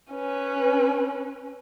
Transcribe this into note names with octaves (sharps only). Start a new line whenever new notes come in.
C#4 B4